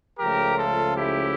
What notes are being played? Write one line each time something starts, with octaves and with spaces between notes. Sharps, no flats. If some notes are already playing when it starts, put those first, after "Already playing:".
C#2 C#3 F3 A3 G4 A#4
F4 A4
E4 G4